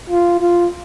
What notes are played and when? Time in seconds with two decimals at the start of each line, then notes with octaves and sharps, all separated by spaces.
0.10 F4
0.40 F4